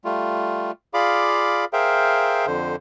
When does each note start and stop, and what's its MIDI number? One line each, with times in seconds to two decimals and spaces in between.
0.05 0.71 55
0.05 0.71 57
0.05 0.71 65
0.94 1.65 65
0.94 1.65 68
0.94 1.65 74
0.94 1.65 77
0.94 1.65 83
0.94 1.65 86
1.73 2.46 68
1.73 2.46 70
1.73 2.46 72
1.73 2.46 76
1.73 2.46 77
1.73 2.46 79
2.47 2.76 41
2.47 2.76 50
2.47 2.76 72